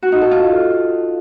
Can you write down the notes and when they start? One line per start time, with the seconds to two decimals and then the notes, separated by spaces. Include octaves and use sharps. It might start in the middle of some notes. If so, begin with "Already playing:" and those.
0.03 F#4
0.12 D#4
0.22 A4
0.31 F4